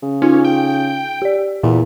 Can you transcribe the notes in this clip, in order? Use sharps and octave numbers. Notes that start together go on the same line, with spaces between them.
C#3
C#4 D#4 F4
G5
G4 D5
E2 A#2